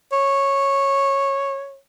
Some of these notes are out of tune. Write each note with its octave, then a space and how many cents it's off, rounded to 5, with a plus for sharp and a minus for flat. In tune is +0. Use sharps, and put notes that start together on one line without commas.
C#5 -10